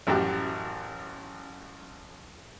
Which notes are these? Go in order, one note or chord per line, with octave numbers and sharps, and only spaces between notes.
A1 F#2 F#4 G4